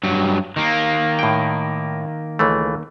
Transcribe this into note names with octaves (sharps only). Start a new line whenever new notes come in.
G2 F#3
D#3 A#3
A2 G5
C#2 E3 A3